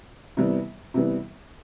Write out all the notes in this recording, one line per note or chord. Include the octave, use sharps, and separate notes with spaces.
C3 E3 G3 B3
C3 E3 G3 B3